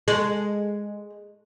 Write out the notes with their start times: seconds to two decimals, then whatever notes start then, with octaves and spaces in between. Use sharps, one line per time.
0.08 G#3